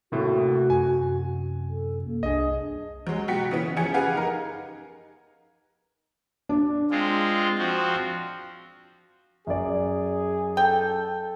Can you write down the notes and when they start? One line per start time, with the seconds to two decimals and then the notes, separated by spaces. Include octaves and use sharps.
0.12 D#2 A2 C3 A3 F#4
0.70 F#2 G#5
1.69 A4
2.05 A#3
2.23 C2 D4 G#4 D#5
3.07 F#3 G#3
3.28 B2 F#4 G5 B6 C#7
3.51 C#3 E3 B3 C#4
3.76 F3 C#4 G#4 G#5 C#7
3.94 G4 G#4 B4 F5 F#5 G#5
4.15 D#4 A#4
6.49 D4
6.91 G#3 C4 F4
7.58 F3 C4 F#4
9.47 F#2 G#4 D5
10.57 A4 G5